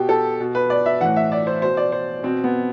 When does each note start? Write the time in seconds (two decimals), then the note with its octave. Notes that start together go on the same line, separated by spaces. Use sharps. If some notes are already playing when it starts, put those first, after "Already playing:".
Already playing: B2 G4
0.09 A4
0.40 B2
0.55 B4
0.70 D5
0.86 E5
1.01 A2 E3 F#5
1.16 E5
1.32 D5
1.47 C5
1.62 B2 C5
1.77 D5
1.92 C5
2.23 B2 C4
2.44 B3